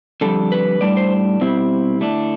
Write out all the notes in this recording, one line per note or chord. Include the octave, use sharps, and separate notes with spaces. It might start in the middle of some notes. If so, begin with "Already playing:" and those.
F2 D3 G3 A4
B4
A2 G3 D4 D5
C5
B2 G3 C4 E4
D3 A3 D4